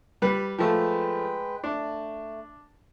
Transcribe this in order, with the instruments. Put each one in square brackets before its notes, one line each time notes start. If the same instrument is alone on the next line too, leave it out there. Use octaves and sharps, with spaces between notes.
[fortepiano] G3 B4
[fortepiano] F3 A3 [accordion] G#3 B4 G5
[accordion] A3 [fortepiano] D4